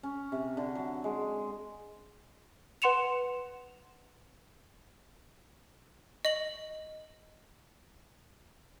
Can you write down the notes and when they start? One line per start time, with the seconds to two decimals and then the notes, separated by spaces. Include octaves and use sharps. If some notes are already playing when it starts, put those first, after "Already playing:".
0.03 C#4
0.32 C3
0.57 D3
0.75 F#3
1.04 G#3
2.82 B4 F#5 C6 C#7 E7 F7
6.25 D#5 F#7